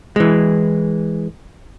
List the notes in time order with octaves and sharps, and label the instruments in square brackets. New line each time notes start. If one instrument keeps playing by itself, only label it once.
[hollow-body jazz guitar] E3 G#3